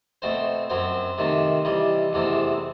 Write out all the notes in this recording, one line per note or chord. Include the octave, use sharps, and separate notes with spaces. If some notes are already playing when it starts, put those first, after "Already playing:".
B2 A3 C4 C5
F#2 F#3 C4 C5
C3 D#3 A3 C4
C3 E3 G3 D#5
E2 C3 E3 A3 C4